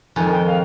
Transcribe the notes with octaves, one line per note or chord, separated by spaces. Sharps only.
F2 D#3 G#3 G#5
G5
F5